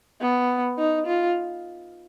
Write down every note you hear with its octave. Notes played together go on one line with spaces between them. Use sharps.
B3
D#4
F4